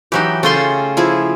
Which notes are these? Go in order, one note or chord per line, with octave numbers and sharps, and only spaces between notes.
E3 F#3 D#4 G4 E5
C#3 A3 F4 G5 C6
F3 E4 G#4